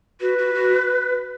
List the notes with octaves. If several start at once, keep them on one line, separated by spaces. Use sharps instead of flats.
F#4 B4
F#4
F#4